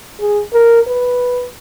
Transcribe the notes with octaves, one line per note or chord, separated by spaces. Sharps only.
G#4
A#4
B4